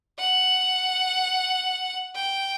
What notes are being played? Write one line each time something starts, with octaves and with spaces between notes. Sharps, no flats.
F#5
G5